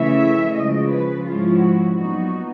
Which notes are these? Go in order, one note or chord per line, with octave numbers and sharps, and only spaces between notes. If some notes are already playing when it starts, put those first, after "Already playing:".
Already playing: C#3 E3 A3 C#4 E5
C#3 F3 G#3 D#5
B4
G#2 F3 G#3 C#4 E4 F4
F#4
A#2 F#3 B3 D#4 F#4